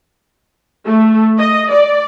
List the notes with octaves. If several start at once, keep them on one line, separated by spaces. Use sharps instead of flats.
A3
D#5
D5